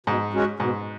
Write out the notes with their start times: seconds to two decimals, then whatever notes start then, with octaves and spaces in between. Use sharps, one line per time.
0.07 G#2 B2
0.33 G#3 C#4 F#4
0.60 G#2 B2